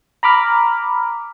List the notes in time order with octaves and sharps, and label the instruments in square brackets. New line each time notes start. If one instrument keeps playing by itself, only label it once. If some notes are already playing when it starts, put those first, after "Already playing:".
[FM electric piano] A#5 B5 D6 F6